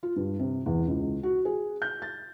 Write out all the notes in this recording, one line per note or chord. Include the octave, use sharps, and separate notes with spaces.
F4
G2
C3
E2
C#2
F#4
G#4
G6
A6